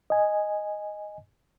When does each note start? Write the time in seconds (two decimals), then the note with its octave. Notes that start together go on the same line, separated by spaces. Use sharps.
0.10 D#5 G#5